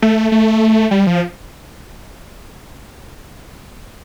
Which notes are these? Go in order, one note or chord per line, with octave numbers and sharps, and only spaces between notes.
A3
A3
G3
F3